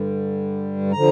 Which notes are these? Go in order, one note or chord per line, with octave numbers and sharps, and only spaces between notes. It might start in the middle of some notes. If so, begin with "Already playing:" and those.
Already playing: G2 D3 G3
D3 F3 A#5